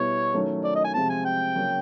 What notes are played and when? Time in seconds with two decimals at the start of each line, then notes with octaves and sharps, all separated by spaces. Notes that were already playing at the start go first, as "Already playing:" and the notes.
Already playing: B2 G3 B3 E4 C#5
0.34 D#3 F#3 A3 C#4
0.64 D5
0.75 D#5
0.84 G#5
0.94 C3 F3 G#3 C4 A5
1.09 G#5
1.25 G5
1.55 C#3 F#3 A#3 C#4